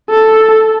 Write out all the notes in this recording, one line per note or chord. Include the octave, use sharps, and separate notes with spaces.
A4